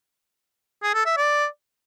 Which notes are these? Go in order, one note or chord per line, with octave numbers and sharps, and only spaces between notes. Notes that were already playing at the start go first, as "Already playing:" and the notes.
G#4
A4
E5
D5